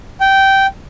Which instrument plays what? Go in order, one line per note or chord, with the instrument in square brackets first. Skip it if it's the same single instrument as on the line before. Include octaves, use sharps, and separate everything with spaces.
[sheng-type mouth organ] G5